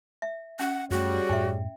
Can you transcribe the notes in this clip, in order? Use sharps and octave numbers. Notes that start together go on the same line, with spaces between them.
E5
C#4 F#5
F#2 G3 A3 F#4 G#4 C#5
F#2 A2 E5 G5